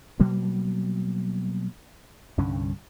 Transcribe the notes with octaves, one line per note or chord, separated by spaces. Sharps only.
B2 F#3 G3 A#3
C2 G2 D3 C#4